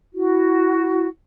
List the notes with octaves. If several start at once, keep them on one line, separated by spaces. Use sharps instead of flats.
E4 F#4